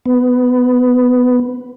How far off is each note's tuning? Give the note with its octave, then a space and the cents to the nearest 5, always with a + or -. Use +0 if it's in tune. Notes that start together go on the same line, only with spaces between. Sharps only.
B3 +15